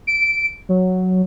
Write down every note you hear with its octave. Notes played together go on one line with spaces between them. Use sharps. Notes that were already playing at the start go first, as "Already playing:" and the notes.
D7
F#3